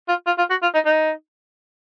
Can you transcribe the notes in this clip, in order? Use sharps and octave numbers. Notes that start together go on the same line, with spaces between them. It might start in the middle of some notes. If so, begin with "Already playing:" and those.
F4
F4
F4
F#4
F4
D#4
D#4